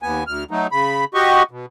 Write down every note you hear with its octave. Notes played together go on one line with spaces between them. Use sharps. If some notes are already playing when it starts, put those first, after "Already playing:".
D#2 B3 G#5
D2 F6
F#3 A3 D#4
C#3 B5
F#4 G4 D#5 C#6
B2